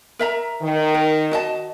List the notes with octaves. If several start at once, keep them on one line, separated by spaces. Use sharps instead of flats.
A#4 E5 A#5
D#3
A#4
F#4 D#5 A5